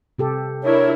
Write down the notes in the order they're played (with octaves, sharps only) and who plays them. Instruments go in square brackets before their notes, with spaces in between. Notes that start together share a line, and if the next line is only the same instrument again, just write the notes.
[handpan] C3 G4 A4
[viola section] D4 E4 A#4 [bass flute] C#5